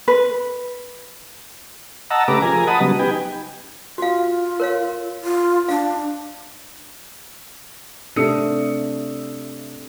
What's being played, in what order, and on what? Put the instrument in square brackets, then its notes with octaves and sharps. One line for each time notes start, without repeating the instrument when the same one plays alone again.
[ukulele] B4
[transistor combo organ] D#5 F#5 A5 A#5 E6
C#3 A3 G4 B4 A#5 D6
F3 G#4 A#4 G#5 A#5
D#5 F#5 A5 B5 D#6
C#3 F#3 G3 B3
D#4 G4 B4 G5 G#5
[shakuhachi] F4 [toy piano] F#4 F5
[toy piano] A#4 C#5 F5
[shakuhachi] F4
[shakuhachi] D4 [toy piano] F5
[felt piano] C3 A3 D4 D#6 E6 C#7